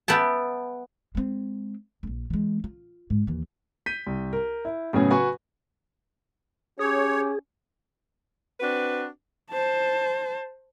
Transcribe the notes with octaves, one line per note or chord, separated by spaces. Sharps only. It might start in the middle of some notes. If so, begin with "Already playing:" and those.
B3 E5 G5 A5
G#3 C4
D1 A#1
E3 G#3
F4
G#2
D#2 E3
G6 B6 D#7
C2
A#4
E4
A2 C#3 F#3 B3 C#4 G#4
F#4 B4 G#5 C#6
C#4 G4 G#4 C#5
C4 D4 F#4 B4
C5 A5